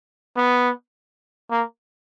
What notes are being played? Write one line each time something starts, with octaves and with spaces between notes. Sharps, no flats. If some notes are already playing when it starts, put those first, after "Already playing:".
B3
A#3